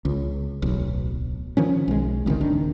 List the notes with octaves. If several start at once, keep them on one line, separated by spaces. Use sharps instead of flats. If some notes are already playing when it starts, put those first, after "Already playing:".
C#2
D1 B1
D#3 F3 C#4
B1 G#3
G#1 C#2 C3 D#3
D#1 D#3 D4